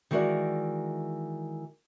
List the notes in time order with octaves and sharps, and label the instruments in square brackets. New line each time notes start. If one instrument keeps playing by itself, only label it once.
[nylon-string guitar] D#3 E3 G#3 F#4 A#4 D5